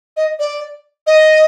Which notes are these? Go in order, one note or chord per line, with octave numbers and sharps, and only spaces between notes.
D#5
D5
D#5